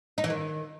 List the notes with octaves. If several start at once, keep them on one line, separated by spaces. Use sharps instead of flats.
D#4
E3
D#3